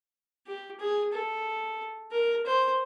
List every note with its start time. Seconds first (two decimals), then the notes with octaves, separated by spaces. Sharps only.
0.47 G4
0.80 G#4
1.13 A4
2.12 A#4
2.46 C5